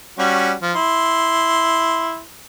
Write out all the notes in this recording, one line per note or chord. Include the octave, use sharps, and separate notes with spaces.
G3 C#4 F#4
F3
E4 C6